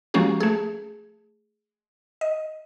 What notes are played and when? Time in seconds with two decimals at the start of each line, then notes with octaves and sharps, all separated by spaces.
0.14 F3 G#3 A#3 C#4 F#4 G4
0.40 A3 G#4
2.21 D#5